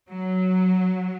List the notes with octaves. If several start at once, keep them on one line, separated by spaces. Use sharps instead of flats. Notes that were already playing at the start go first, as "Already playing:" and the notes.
F#3